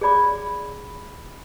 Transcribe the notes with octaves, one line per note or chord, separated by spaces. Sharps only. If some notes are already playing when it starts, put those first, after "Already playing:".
G#4 C#5 D5 B5 D6